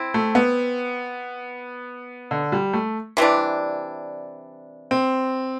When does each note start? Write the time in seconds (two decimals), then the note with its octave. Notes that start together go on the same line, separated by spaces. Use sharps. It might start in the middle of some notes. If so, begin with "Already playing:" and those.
Already playing: C4 E4
0.14 A3
0.35 B3
2.31 D3
2.52 G3
2.73 A3
3.17 C3 E3 G3 D4
4.91 C4